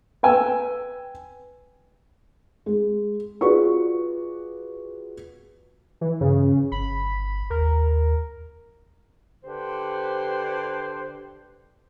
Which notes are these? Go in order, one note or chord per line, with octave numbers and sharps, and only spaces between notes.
B4 G5 G#5 E6
G#3
F4 F#4 G#4 B4 D5 C#6
E3
G2 C#3
G1 B5
D#2 A#4
D3 G4 B4 C5